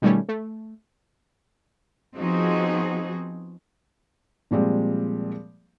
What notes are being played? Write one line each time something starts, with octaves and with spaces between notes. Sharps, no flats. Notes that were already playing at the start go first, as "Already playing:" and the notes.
B2 D#3 G3 A3 C#4
A3
F3 B3 C4 D#4 F#4 G#4
A#2 F3 G3 G#3 C4